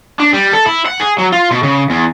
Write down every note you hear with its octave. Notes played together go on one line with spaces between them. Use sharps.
D4
G3
A4
E4
F#5
G#4
F#3
F4
B2
C#3
E2